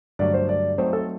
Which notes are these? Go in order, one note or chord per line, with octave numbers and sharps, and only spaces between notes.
G2 D3 F#3 A3 D5
C5
D5
F#3 A3 C4 D#4 C5
A4